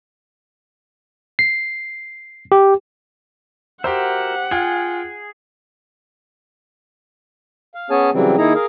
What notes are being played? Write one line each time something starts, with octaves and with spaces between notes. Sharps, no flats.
C7
G4
F#4 G4 A#4 C5 E5 F#5
F4 G#4 G5 G#5
F5
B3 C#4 G#4 C#5 G#5 A5
C#3 E3 F#3 G3 C4
D#3 A#3 D#4 E4 G#4 A#5
G#4 A#4 F5